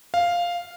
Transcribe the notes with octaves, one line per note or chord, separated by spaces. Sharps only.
F5